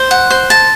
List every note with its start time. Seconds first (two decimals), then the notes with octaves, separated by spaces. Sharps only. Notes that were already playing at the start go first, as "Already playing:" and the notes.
Already playing: C5
0.11 F#5
0.30 C5
0.50 A5